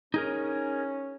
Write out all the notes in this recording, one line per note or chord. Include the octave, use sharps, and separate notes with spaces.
C#4 D#4 G#4 A#4